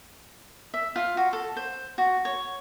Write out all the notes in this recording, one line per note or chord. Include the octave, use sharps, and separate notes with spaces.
E5
F4
F#4
A4
C5
F#4
C#5